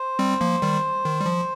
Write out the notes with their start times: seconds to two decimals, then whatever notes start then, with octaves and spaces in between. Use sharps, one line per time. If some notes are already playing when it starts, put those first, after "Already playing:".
Already playing: C5
0.19 G3 C4
0.41 F3 A#3
0.62 D#3 G3
1.04 D#3
1.21 G3
1.26 F3